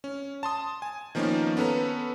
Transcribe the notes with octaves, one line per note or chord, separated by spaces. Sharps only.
C#4
A5 C6 D#6
G#5
D#3 F3 A#3 B3 C#4 D#4
B3 C#4 A4 B4 A#5